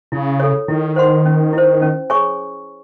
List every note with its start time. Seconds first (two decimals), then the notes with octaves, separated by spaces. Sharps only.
0.12 C#3 E4
0.40 A4 C#5
0.68 D#3 E4
0.96 C5 F#5 C6
1.26 C#4
1.53 E4 C5
1.82 C#4
2.10 G#4 C#5 G#5 C#6